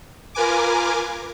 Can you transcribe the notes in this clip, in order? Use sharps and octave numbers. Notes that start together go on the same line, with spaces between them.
F4 A#4 B4 G#5 D6